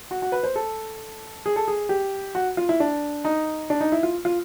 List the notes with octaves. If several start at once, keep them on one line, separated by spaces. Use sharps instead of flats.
F#4
F#4
B4
C5
A4
G#4
A4
G#4
G4
F#4
F4
E4
D4
D#4
D4
D#4
E4
F4
F4